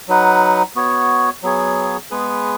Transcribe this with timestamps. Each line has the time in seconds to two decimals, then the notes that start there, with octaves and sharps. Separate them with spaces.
0.08 F#3 D#4 B4 F#5
0.75 B3 F#4 C#5
1.43 F#3 B3 G#4 C#5
2.11 G#3 B3 G#4 B4